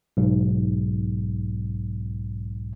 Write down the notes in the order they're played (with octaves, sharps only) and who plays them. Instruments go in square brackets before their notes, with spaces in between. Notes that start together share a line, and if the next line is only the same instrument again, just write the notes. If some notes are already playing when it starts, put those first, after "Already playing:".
[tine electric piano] B1 G#2